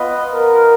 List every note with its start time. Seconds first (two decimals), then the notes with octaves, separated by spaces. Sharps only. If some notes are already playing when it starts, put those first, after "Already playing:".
Already playing: B3 F4 B4 D#5
0.33 A#4